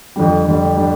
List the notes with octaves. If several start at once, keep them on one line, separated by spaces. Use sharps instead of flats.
F2 D3 G3
F2 D3 G3
D3 G3